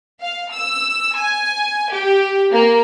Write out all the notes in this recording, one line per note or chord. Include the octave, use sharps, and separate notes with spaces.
F5
E6
G#5
G4
A#3